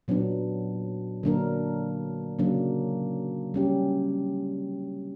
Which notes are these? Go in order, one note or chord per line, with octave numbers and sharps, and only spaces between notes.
A#2 F#3 B3 D4
D3 F#3 A#3 D4 A#4
C#3 F#3 A#3 D4
G3 C#4 G4